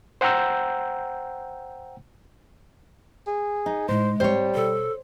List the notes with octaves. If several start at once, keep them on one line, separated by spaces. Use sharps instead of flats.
C5 F#5 G5 A#5 E6 G6
G#4
D#4
A2 G#3 C5
G#2 G3 C4 C5 C#5
B2 A4